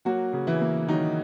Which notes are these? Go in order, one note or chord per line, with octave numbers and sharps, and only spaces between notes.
F#3 A#3 F#4
C#3
E3 E4
A#3
D#3 F#3 D#4